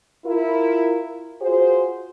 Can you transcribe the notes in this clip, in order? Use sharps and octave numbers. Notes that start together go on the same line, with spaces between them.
E4 F4 A#4
F4 F#4 G#4 C5